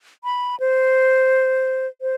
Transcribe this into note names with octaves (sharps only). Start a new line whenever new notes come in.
B5
C5
C5